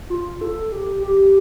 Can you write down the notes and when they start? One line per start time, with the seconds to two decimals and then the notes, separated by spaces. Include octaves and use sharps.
0.10 F4
0.41 A4
0.72 G4
1.03 G4